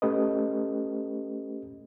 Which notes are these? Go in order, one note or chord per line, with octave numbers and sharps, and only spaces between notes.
A3 C#4 G4 A4 B4 D#5